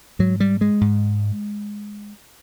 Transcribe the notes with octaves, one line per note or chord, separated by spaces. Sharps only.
G#2 F#3
G3
G#3
G#2